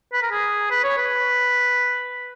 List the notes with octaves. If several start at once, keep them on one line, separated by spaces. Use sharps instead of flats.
B4
A#4
G#4
B4
C#5
B4